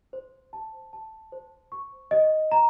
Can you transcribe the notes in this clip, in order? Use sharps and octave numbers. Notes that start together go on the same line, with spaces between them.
C5
A5
A5
C5
C#6
D#5
A#5